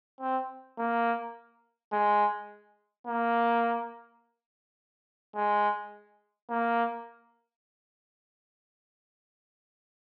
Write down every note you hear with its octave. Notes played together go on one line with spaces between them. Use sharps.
C4
A#3
G#3
A#3
G#3
A#3